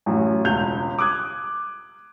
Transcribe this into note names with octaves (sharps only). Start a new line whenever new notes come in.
A1 F#2
E1 C#2 G6 F7
D6 D#6 F#6 G#6